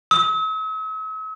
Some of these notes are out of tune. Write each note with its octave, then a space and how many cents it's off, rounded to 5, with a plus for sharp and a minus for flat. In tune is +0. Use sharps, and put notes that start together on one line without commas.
E6 -45